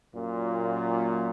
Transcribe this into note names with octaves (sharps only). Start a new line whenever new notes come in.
F#2 A#2